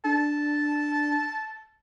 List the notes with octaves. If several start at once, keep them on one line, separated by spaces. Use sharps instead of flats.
D4 A5